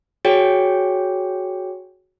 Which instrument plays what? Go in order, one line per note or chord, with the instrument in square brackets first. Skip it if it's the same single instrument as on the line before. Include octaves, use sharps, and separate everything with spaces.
[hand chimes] F#4 G#4 C#5 G5